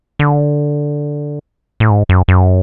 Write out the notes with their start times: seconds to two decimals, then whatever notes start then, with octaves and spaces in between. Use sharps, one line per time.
0.19 D3
1.80 A2
1.90 G#2
2.09 F#2
2.28 F#2